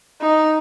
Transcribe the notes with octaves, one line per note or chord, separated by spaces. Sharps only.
D#4